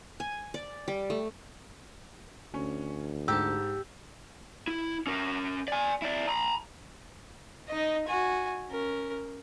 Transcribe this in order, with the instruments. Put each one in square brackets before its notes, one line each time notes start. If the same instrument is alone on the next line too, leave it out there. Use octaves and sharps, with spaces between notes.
[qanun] G#5
D5
G3
A3
[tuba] D2 [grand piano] C#4
[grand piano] G#2 [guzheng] G4 A5 [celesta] E6
[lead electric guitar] E4
C#4 A#4
D5 G#5
E4 D5
A#5 B5
[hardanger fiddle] D#4 D#5
F#4 G#5
C#4 A#4